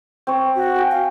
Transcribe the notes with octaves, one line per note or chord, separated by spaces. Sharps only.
C4 C#5
F#4
G5 G#5
F5